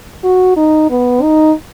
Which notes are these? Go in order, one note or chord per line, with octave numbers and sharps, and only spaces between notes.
F#4
D#4
B3
D#4